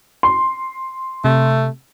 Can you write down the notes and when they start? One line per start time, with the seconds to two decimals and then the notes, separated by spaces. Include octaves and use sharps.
0.23 C6
1.24 C3 A3